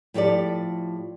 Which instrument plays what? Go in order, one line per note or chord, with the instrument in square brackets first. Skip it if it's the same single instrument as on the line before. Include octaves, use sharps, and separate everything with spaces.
[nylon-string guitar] A2 F3 G4 A4 D5